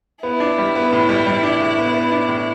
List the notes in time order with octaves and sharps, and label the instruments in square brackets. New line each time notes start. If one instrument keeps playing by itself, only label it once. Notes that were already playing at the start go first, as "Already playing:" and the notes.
[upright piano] B3 [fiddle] E4
[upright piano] D4
G3
B3
A2
G3
G3
D4
A2
B3
B3
D4
A2